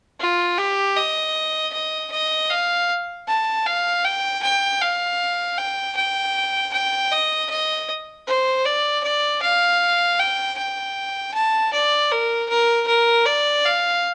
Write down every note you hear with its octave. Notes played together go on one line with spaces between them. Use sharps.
F4
G4
D#5
D#5
D#5
F5
A5
F5
G5
G5
F5
G5
G5
G5
D#5
D#5
C5
D5
D5
F5
G5
G5
A5
D5
A#4
A#4
A#4
D5
F5